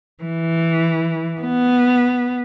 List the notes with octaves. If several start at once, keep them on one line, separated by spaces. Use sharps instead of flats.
E3
B3